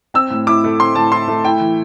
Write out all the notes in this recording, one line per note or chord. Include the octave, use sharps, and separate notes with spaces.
C4 E6
A2
E4 D6
A3
C4 C6
A2 A5
E4 C6
A3
E4 G5
E3